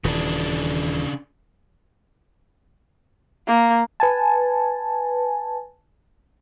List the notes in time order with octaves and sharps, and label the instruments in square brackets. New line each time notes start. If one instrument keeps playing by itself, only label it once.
[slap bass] D#1 E3 [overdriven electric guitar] C#3 D4
[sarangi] A#3
[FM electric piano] B4 G#5 A5